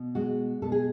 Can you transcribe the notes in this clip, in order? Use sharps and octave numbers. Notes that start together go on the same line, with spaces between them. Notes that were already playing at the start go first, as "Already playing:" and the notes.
Already playing: B2
G#3 F#4
B2 A4
G#4